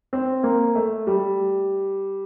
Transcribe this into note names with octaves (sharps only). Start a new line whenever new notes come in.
C4
A#3
A3
G3